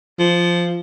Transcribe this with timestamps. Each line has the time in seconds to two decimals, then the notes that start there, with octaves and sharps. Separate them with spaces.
0.19 F3